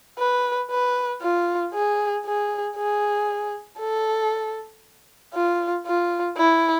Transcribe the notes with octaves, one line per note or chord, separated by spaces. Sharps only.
B4
B4
F4
G#4
G#4
G#4
A4
F4
F4
E4